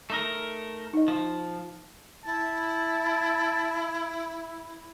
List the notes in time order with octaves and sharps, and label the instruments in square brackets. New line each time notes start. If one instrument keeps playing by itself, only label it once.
[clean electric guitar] A3 D#4 A#4
[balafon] D#4 D#5
[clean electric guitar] F3
[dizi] E4 [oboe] A5